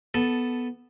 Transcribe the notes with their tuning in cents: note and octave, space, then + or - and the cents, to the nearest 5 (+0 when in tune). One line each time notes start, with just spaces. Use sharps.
B3 +0 A4 -10 A5 +0